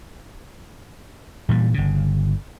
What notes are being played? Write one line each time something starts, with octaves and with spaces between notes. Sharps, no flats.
A#2 E3 G3
G1 C#3